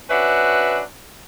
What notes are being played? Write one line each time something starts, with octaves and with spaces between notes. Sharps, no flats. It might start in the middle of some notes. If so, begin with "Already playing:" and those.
C#4 D4 F#4 B4 E5